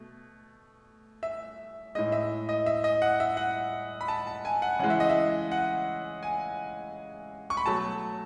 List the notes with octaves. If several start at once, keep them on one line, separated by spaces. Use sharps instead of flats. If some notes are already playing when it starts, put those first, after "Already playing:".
Already playing: B2 A3
E5
A2 G#3 D#5
E5
D#5
E5
D#5
F#5
E5
F#5
B5
A5
A5
G#5
F#5
C#3 E3 G#3 F#5
E5
D#5
E5
F#5
G#5
C#6
B5
B2 F#3 A3 A5